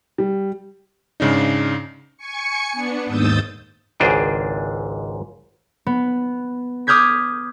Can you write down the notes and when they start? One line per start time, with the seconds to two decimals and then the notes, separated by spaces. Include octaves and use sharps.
0.18 G3
1.20 G#2 C#3 D4 D#4
2.17 G#5 C#6 C#7
2.72 B3 D4
3.06 D#2 G#2 D#6 E6 G6 A6
4.00 G#1 C#2 G#2 D4 G#4 G5
5.86 B3
6.87 D6 D#6 F6 G6 G#6 B6